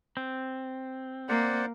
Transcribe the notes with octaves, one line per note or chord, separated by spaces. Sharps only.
C4
A#3 C5 D5 F#5